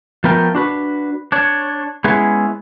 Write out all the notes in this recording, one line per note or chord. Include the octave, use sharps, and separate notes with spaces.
F3 A3 B3 A#4 G5
D4 F#4 B4
D4 C#5
G#3 B3 C#4 E4 G#4